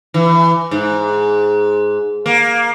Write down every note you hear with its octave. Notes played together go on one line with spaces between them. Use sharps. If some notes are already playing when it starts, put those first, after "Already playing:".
E3
G#2
A#3